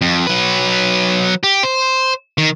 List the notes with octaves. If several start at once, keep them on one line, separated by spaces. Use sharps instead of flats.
F2
F#3 B4
G4
C5
D#3